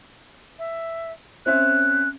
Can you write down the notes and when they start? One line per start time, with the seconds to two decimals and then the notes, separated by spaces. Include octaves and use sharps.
0.59 E5
1.46 C4 C#4 E5 F#6